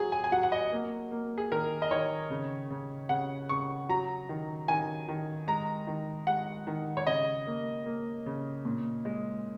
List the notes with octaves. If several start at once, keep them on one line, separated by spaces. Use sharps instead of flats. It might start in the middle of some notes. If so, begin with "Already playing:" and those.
Already playing: F#3 G#4
G#5
G#5
F#3 F#5
F#5
D#5
A#3
A#3
G#4
D#3 A#4
D#5
D#3 C#5
C#3
C#3
C#3 F#5
C#3 C#6
F#3 A#5
D#3
D#3 G#5
D#3
G#3 A#5
D#3
G#3 F#5
D#3
C#5
C#3 D#5
A#3
A#3
C#3
A#2
G#3